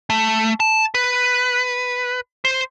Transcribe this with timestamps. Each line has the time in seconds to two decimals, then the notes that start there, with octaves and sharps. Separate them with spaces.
0.10 A3
0.60 A5
0.95 B4
2.45 C5